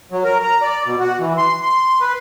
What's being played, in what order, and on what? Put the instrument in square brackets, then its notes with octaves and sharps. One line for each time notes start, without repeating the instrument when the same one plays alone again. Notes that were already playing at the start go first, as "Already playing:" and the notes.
[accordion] F#3
A#4
A#5
D5
B2
F#4
E3
C6
C6
B4